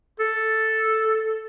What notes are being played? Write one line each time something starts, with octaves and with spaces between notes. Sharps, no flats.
A4